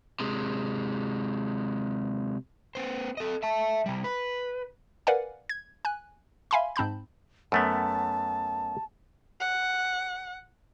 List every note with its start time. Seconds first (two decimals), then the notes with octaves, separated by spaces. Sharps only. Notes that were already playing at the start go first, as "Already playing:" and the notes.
0.20 C3 G#3
2.75 B3 C5
3.17 A4 D#5
3.43 E5 A5
3.86 C3 G3
4.04 B4
5.07 A#4 B4 D5 F5 F#5 G#5
5.49 G#6
5.85 G#5 F#6
6.51 E5 F5 G#5 B5 C6
6.76 G#2 C4 A5 B5 G6
7.52 F#2 A3 B3 A5
9.40 F#5